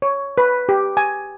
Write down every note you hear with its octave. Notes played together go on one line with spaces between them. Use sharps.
C#5
B4
G4
G#5